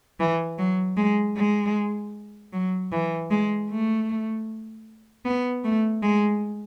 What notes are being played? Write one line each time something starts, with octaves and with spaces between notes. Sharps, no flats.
E3
F#3
G#3
G#3
F#3
E3
G#3
A3
B3
A3
G#3